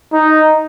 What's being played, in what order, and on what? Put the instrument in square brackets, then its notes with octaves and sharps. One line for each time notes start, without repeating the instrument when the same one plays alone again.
[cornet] D#4